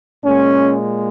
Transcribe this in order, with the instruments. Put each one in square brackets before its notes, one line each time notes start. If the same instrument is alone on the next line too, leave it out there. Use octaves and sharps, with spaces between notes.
[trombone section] A#2 G#3 C#4